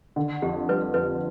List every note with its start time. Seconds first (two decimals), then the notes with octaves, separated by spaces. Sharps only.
0.16 D3
0.42 F2 G4
0.69 G3 B4
0.94 F2 B4